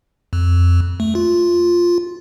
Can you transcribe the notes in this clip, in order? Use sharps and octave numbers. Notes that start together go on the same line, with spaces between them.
F2
A3
F4